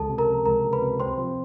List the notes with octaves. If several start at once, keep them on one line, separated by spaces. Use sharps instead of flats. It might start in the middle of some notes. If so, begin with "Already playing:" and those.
Already playing: C#2 A4 A5
C3
A#4 A#5
F3
C#2 A#4 A#5
C#2
B4 B5
C3
C4 C5 C6
F3